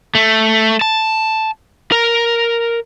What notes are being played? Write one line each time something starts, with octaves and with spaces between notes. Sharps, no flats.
A3
A5
A#4